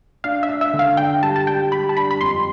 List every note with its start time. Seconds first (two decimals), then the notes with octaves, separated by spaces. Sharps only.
0.24 D4 F5
0.43 E5
0.49 D4
0.61 E5
0.73 D3
0.79 F5
0.97 D4 G5
1.22 G3 A5
1.36 A5
1.47 G3 G5
1.72 G3 B5
1.89 A5
1.96 D4 B5
2.11 B5
2.21 F2 C6